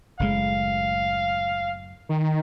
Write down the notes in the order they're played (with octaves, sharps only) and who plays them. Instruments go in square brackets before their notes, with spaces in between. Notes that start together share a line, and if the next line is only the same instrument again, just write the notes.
[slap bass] F#1 A2 G#3 [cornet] F5
[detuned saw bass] D#3